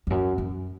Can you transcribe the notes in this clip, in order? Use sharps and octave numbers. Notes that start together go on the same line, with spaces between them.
E2
F#2
F#2